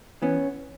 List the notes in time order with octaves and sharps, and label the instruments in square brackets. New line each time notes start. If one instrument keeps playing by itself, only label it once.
[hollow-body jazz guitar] E3 B3 C#4